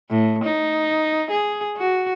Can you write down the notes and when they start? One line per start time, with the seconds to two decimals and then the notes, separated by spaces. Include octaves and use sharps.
0.10 A2
0.44 D#4
1.31 G#4
1.77 F#4